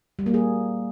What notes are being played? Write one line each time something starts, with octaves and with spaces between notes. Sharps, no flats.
G3
A#3
G#4